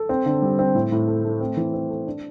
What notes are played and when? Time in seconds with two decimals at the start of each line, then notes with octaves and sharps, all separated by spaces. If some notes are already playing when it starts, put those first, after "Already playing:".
Already playing: A4
0.09 C4
0.26 D3
0.42 G3
0.59 C4
0.75 A2
0.92 A2
1.08 A4
1.25 A3
1.41 C4
1.57 E3
1.73 C4
1.90 A4
2.06 D4